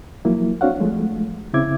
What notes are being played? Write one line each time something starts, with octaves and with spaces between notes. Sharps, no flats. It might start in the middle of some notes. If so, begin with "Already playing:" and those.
F3 F#3 A#3 E4
C4 D4 F#4 C#5 F5 F#5
F3 G#3 A3
C#3 C4 E4 E5 D6 G#6